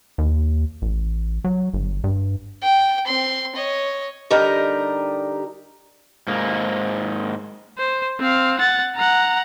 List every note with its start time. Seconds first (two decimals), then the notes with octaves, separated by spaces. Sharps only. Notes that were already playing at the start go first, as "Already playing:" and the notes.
0.18 D#2
0.82 A1
1.44 F#3
1.74 G1
2.04 G2
2.63 G5
3.07 C4 C6
3.56 C#5 D#5
4.30 D3 G3 D#4 G4 A#4
6.27 G#2 A#3
7.78 C5
8.19 C4 F5
8.59 F#5 A6
8.96 F#5 A#5